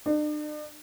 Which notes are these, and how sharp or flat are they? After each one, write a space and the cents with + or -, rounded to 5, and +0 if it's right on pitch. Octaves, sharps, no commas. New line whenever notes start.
D4 +45